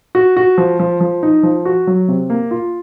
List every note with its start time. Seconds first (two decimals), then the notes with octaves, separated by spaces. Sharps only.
0.15 F#4
0.37 F#4
0.58 F3
0.80 F3
1.00 F3
1.23 D#4
1.43 F3
1.65 F#4
1.87 F#3
2.08 C3
2.30 A#3
2.51 F4